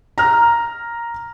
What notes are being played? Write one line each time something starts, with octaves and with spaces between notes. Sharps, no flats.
A#5 F6